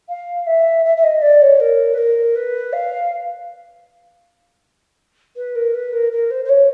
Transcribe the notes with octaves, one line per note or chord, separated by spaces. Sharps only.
F5
E5
E5
E5
D#5
D5
C#5
A#4
B4
A#4
B4
F5
B4
A#4
B4
A#4
A#4
C5
C5
C#5